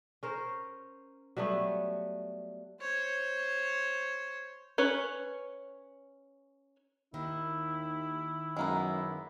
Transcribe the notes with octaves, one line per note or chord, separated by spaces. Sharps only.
C#4 A#4 C5
F#3 G3 A3 B3
C5 C#5
C#4 B4 C#5
D#2 D#3 E4
F#2 G#3 A#3 B3